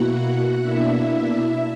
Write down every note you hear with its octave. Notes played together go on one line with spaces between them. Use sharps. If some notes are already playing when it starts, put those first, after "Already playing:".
Already playing: B2 A#3 E4 F#4 F#5
B2 A#3 D4 E4 E5